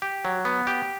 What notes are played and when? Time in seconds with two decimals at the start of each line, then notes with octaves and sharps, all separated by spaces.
0.02 G4
0.25 F#3
0.45 B3
0.67 G4